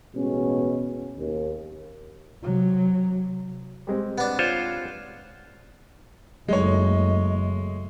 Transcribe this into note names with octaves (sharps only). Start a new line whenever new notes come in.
A1 B2 G#3 C#4
D#2
C3 F#3
G3 G#3 C4
B3 D4
F4 C5 C#5
F#1 F#3 G#3 A3 D#4 C#5 D#5